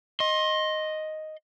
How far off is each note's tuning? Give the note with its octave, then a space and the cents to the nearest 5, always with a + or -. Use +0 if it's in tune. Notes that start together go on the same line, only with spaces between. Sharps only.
D#5 +0 C6 +30